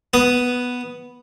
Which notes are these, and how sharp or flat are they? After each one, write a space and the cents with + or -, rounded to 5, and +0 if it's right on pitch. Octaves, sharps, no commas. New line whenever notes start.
B3 +0 D#6 +0